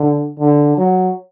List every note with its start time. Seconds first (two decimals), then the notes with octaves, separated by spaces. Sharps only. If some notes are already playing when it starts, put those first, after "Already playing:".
Already playing: D3
0.40 D3
0.78 F#3